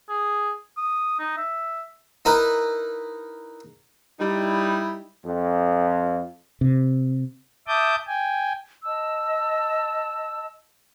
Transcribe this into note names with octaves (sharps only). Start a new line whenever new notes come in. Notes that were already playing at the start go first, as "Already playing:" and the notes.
G#4
D#6
D#4
E5
D#4 E4 A#4 B4
G3 D#4 E4
F2
C3
E5 A5 D6 D#6 G6
G5 G#5
D#5 A5 E6